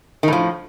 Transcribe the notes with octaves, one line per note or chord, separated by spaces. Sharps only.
A2 D#3 F3